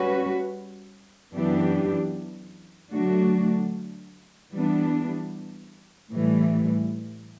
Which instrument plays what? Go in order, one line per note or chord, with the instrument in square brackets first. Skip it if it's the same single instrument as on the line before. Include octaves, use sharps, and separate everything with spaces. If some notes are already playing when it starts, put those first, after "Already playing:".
Already playing: [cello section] G3 C#4 F#4 B4
F#2 E3 B3 D4 G4
D3 F#3 A3 D4 F#4
E3 G3 B3 D4
A2 E3 G3